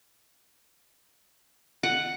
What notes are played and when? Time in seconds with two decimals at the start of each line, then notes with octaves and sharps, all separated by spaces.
1.83 F#5